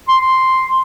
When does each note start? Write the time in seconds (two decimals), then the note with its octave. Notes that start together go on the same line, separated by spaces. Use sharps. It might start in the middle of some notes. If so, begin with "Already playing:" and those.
0.08 C6